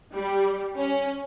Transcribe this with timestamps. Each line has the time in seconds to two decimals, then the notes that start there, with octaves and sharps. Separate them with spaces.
0.15 G3
0.78 C#4